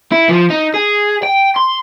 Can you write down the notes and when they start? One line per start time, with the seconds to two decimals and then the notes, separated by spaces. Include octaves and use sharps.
0.12 E4
0.29 F3
0.50 D#4
0.74 G#4
1.23 G5
1.56 C6